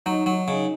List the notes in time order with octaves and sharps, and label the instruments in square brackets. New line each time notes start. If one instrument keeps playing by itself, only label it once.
[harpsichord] F#3 [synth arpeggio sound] D#4
[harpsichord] F#3
C#3